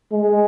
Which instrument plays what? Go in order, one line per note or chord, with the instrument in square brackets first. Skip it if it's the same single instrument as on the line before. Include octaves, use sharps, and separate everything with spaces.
[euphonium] G#3